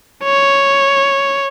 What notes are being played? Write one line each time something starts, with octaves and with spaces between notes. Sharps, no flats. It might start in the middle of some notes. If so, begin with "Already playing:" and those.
C#5